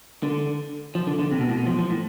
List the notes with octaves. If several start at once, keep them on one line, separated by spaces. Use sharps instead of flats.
D3
F3
D3
D3
C3
B2
A2
B2
F3
F3
A2